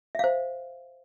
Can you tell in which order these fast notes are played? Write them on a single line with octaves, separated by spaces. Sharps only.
E5 F5 C5